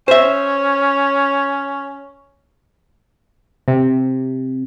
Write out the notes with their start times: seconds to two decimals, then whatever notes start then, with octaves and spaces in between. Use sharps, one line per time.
0.08 C#4 C5 E5
3.68 C3